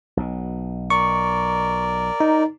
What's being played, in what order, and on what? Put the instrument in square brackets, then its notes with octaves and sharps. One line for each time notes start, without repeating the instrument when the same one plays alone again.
[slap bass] B1 B2
[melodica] A#4 D5 [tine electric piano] C#6
[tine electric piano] D#4